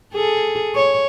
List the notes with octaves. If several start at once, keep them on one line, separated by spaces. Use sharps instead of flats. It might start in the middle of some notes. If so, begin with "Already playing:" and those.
G#4 A4
C#5